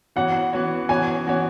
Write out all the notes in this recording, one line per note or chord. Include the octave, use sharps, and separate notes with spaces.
E3 B3 F#4 C#5 F#5
E3 B3 F#4 C#5
E3 B3 F#4 C#5 G#5
E3 B3 F#4 C#5